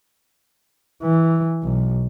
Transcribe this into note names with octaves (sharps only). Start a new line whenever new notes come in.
E3
B1